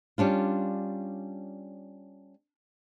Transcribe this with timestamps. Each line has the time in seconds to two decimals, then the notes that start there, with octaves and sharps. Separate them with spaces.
0.18 G3 C#4 D4 F4